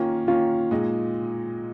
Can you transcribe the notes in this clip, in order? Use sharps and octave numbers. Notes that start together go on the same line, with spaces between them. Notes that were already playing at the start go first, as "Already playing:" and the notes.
Already playing: D#3 A#3 C#4 F4
D#3 A#3 C#4 F4
A#2 G#3 D#4